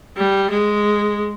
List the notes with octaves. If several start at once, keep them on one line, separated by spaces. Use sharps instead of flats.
G3
G#3